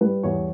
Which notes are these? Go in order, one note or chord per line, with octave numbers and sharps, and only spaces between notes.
G3 B4
E2 C#5